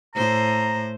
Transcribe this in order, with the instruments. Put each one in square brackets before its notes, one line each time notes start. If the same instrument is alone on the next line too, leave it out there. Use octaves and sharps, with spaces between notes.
[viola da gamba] A2 C5 [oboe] A#5